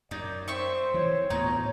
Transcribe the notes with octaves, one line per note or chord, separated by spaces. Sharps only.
F#2 D#4 D5
C4 C5 E5 C#6
E3 C#5
D2 A2 B3 D#4 A#5 C#6